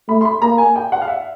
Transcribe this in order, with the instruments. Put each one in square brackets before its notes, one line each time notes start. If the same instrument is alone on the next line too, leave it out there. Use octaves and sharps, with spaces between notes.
[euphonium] A3 [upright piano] B5
[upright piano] C6
B5
[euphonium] A#3 [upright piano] A#5
[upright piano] G#5
G5
F#5
F5
E5